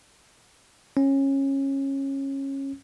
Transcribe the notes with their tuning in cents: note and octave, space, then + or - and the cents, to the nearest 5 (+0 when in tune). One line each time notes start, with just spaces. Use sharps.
C#4 -20